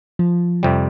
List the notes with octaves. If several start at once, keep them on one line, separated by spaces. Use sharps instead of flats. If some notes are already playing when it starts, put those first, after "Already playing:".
F3
F2 C3 G3